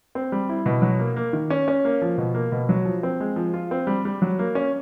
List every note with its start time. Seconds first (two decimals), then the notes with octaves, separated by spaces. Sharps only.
0.15 C4
0.32 G3
0.49 E4
0.66 B2
0.82 F#3
0.99 A#3
1.16 A#3
1.33 D#3
1.50 C#4
1.68 C#4
1.85 A#3
2.02 F3
2.18 B2
2.35 A#3
2.52 B2
2.69 F#3
2.85 F3
3.03 C4
3.20 G#3
3.36 F3
3.54 F4
3.71 C4
3.87 G3
4.05 G3
4.22 F#3
4.39 A#3
4.55 C#4